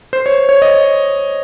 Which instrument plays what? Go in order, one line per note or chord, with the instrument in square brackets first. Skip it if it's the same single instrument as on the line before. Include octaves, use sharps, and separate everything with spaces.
[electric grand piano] C5
C#5
C#5
D#5